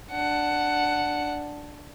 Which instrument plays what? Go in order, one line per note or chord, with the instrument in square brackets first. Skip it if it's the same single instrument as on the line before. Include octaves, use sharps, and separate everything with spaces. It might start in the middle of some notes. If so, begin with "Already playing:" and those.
[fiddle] D4 F#5